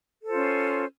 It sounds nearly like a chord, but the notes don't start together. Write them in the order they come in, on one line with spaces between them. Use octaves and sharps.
A4 C5 F4 C#4